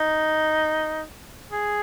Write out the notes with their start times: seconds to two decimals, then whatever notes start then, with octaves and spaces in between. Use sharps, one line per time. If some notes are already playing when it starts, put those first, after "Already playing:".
Already playing: D#4
1.51 G#4